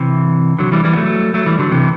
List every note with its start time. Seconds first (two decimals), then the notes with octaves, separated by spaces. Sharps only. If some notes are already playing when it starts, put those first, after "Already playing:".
Already playing: C3 E3
0.59 D3 F#3
0.72 E3 G3
0.84 E3 G3
0.93 B3
0.96 F#3 A3
1.34 F#3 A3
1.46 E3 G3
1.59 D3 F#3
1.72 C3 E3